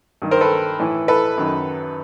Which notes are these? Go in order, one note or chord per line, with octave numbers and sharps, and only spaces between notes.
G2 D#3
A#4 C5
A4 B4
A2 E3
A4 B4
F#2 D#3